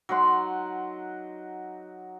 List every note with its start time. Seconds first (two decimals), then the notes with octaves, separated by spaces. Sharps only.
0.09 F#3 D#4 F#5 C6